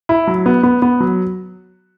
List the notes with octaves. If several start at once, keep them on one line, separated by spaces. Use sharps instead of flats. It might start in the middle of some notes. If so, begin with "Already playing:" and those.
E4
F#3
B3
B3
B3
F#3